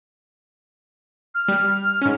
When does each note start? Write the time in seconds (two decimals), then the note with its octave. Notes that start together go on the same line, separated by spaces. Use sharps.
1.35 F6
1.48 G3
2.01 G#2 C#4